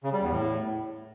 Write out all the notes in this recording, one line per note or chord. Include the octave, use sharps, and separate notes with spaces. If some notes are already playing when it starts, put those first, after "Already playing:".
C#3
G3
E2
A2